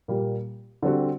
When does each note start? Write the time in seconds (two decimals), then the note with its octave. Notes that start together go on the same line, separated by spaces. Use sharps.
0.08 A#2 G3 A#3
0.83 D3 G3 C4 F#4